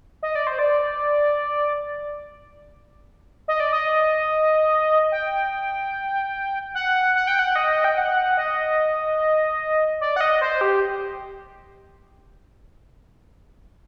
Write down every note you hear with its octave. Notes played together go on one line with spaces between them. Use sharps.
D#5
D5
C5
D5
D#5
D5
D#5
G5
F#5
F#5
G5
F#5
D#5
G5
F#5
D#5
D5
F#5
D#5
C5
G4